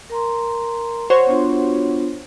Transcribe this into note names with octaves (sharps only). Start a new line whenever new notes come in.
A#4 A#5 C6
F#4 C5 C#5
B3 D4 F4